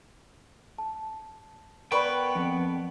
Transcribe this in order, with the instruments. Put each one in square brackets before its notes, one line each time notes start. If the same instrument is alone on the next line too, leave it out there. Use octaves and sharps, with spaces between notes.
[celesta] A5
[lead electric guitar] B3 G5 [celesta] A#4 D5 B5 [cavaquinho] B4 C#6
[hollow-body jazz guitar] F2